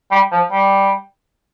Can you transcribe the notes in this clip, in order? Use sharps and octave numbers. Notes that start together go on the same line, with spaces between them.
G3
F3
G3